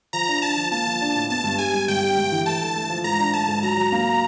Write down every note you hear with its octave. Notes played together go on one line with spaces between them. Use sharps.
F3 A#5
D4
D4 A5
F3
A#3 A5
F3
D4
A2
B3 A5
G2
G3 G#5
G3
G2 G5
G3
G2
E3
A3 A5
A3
A3
F3
G#2 A#5
D4
A3 A5
G#2
F#3 A#5
F#3
A#3